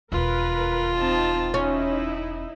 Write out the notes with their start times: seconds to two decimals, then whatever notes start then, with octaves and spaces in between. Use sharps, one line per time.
0.12 E1 D#2 F4 A#4 B4
0.95 C4 D#4 A5
1.54 C#4 D#4 E4